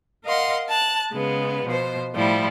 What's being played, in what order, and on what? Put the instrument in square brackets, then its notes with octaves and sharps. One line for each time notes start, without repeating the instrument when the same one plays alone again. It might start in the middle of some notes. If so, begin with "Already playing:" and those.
[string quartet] A#4 D#5 F5 F#5 C6
A5 F#6
C#3 G#3 B3
B2 F3 C5
A2 F3 G3 E4